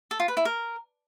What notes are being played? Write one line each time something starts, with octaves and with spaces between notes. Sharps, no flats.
A4
F4
B4
E4
A#4